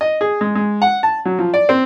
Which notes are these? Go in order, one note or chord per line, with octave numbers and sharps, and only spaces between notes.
D#5
G#4
G#3
G#3
F#5
A5
F#3
F3
D5
C4